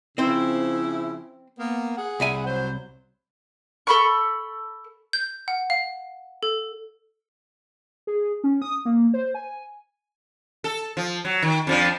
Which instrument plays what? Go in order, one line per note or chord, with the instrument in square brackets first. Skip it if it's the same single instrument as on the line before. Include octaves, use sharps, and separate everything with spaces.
[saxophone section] C#3 F3 E4 [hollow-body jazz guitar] C4 C5
[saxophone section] A#3 B3
G#4 F#5
[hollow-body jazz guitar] C2 E5 G#5
[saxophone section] F#3 C5
[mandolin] A4 B5 C#6
[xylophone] G6
F#5
F5
A4
[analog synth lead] G#4
C#4
D#6
A#3
C5
G#5
[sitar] A4
F3
F#3
D#3
F2 F3 D4